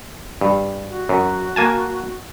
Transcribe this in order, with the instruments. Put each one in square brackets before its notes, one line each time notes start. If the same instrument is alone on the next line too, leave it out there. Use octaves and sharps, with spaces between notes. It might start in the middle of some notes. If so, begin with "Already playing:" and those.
[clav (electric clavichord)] G2
[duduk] F#4
[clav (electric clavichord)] F#2
A#3 G#5 A5